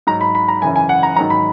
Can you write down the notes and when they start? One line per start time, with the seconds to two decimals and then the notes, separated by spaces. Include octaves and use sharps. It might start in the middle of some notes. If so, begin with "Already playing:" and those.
0.07 G#2 F#3 A#5
0.21 B5
0.35 B5
0.48 A#5
0.62 F#2 C#3 E3 G#5
0.76 G#5
0.89 F#5
1.03 A#5
1.16 G#2 D#3 F#3 A#5
1.30 B5